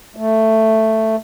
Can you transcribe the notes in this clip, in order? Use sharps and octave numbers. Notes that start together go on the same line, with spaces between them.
A3